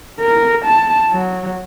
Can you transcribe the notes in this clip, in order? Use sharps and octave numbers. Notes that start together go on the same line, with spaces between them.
A#4
A5
F#3